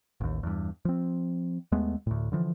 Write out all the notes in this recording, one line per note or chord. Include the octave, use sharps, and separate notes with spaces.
A1 D#2
E2 G2
F3 C4
D#2 G#3 A3 B3
D2 A2
D3 E3 F3